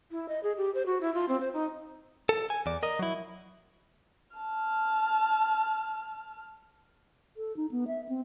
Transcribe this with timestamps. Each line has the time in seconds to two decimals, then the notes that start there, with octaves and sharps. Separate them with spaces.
0.11 E4
0.28 D#5
0.43 G#4
0.57 G4
0.75 C5
0.86 F#4
1.01 E4
1.14 F4
1.29 C4
1.40 C5
1.53 D#4
2.29 A4
2.50 G#5
2.66 E2 D5
2.83 A#4 D#5
2.99 F#3 E4
4.37 A5 F6
7.37 A4
7.57 D#4
7.71 B3
7.87 E5
8.09 C4